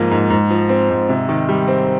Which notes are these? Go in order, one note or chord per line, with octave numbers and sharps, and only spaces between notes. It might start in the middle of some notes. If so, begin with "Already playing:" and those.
Already playing: G#2 F3 A#3
G#2
G#2
F3
C4
G#2
C3
D#3
G3
C4